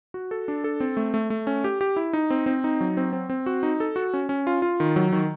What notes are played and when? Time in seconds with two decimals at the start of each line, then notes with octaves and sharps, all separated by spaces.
0.14 F#4
0.31 A4
0.48 D4
0.64 A4
0.80 C4
0.97 A3
1.14 A3
1.30 A3
1.47 C#4
1.64 G4
1.81 G4
1.96 E4
2.13 D#4
2.30 C4
2.46 C4
2.64 D#4
2.81 F#3
2.97 C4
3.13 C4
3.30 C4
3.46 F#4
3.63 D#4
3.80 A4
3.96 F#4
4.14 C#4
4.29 C#4
4.47 F4
4.62 F4
4.80 D#3
4.96 F#3
5.13 D#3